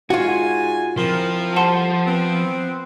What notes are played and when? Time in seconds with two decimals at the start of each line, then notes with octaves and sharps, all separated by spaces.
0.10 G#2 G#3 F4 F#4 G#5
0.98 F3 C4 E4 A#4 C6
1.56 G3 A4 C5 F#5 A5 C6
2.06 B3 C4